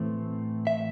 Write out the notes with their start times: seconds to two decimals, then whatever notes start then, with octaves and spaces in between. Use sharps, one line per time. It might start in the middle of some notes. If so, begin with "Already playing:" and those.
Already playing: A2 E3 A3 C4
0.67 E5